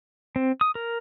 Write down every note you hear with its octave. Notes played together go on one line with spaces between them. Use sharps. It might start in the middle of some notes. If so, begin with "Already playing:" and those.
C4
D#6
A#4